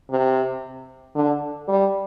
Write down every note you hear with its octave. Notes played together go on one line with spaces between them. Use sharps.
C3
D3
G3